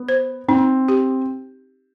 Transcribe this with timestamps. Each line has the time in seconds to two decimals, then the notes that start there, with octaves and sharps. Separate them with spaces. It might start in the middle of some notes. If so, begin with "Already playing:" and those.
Already playing: B3
0.09 C5
0.48 C4 D#4
0.88 G4